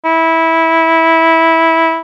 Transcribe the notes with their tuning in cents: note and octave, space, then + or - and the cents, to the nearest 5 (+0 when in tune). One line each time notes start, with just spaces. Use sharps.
E4 -15